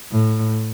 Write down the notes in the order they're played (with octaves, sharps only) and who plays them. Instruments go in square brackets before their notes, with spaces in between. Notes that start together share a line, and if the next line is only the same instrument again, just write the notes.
[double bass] A2